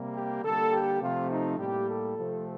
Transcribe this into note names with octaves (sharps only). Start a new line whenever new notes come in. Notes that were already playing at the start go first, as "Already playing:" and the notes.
Already playing: C3 G3 A#3
G4
D3 G3 A#3 A4
G4
C3 F3 A3 C4 F4
D#4
A2 G3 A#3 G4
A4
C3 F3 A3 C4